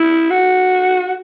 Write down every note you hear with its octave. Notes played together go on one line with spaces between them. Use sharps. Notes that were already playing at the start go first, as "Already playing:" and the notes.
Already playing: E4
F#4